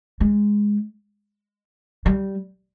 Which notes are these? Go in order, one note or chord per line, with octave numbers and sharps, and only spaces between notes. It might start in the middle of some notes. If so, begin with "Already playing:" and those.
G#3
G3